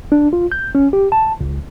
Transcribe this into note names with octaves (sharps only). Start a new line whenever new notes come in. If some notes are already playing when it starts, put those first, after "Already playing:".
D4
F4
G6
C#4
G4
A5
C#2